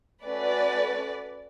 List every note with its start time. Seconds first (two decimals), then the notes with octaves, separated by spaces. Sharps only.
0.24 A3 C#4 F#4 A4 B4 D5